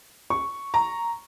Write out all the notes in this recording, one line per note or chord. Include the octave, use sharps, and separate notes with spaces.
C#6
A#5